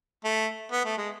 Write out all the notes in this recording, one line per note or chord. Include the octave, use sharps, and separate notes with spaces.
A3
B3
A3
G#3